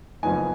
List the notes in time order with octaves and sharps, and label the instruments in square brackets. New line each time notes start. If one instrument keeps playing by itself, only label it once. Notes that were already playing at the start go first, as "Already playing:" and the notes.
[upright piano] F#1 F2 F3 B3 D#4 G#5